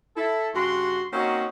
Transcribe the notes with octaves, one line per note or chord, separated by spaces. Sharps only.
E4 A4
G2 C#3 F#4 C6
A#3 C4 C#4 D#4 F#4